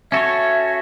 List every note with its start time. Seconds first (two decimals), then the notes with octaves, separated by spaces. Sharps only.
0.12 C#4 F#4 A4 C#5 E5